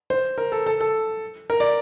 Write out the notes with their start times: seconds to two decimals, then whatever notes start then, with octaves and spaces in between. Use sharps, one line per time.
0.10 C5
0.38 A#4
0.52 A4
0.66 A4
0.81 A4
1.50 A#4
1.60 D5